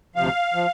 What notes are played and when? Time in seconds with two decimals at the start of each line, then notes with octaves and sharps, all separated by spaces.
0.15 D2 C3 F3 F5
0.54 F3